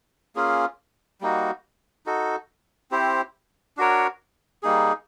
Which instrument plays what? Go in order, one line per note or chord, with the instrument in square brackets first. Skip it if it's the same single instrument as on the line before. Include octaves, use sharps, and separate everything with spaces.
[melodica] A#3 C#4 F4 G#4
G3 A#3 D#4 F#4
D#4 F#4 A4
C4 E4 G4 C5
D4 F#4 A#4 C#5
G3 A#3 D#4 G#4